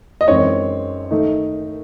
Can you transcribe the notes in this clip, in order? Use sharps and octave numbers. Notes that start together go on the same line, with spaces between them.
D#5
F#2 E3 G#3 C4 D#4 C#5
D#3 A3 D#4